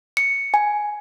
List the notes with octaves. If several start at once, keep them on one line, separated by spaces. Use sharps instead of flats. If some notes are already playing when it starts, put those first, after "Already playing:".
C#7
G#5